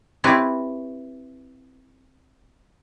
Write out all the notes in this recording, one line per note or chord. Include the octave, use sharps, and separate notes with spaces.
C4 E4 G4 B4 C#5